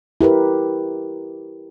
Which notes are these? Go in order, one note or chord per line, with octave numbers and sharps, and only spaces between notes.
E4 G4 A#4 B4